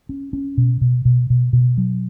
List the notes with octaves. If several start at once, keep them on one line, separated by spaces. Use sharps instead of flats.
C#4
C#4
B2
B2
B2
B2
B2
F#3